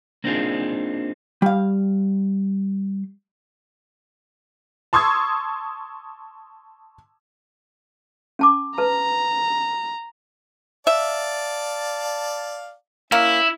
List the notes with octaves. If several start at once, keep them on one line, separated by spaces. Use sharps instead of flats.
A#3 C4 D4 D#4 F4 G#4
G3 F5
A5 C6 C#6 D#6 E6 G#6
C#4 A5 D6
B4 A5 A#5
D5 E5 F5 A5
A#3 C#4 E4